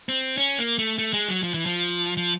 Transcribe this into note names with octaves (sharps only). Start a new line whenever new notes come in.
C4
C#4
A#3
A3
A3
G#3
F#3
F3
E3
F3
F3